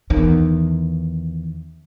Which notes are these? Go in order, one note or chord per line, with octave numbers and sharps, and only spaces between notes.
E2 D#3